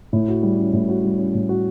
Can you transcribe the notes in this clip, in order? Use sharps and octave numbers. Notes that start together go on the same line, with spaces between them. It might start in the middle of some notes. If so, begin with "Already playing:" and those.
A2
F#4
G3
C#4
A2
F#4
G3
C#4
A2
F#4